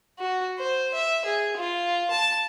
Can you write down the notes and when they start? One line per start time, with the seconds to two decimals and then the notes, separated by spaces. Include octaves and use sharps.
0.19 F#4
0.59 C5
0.95 E5
1.25 G#4
1.57 F4
2.11 A5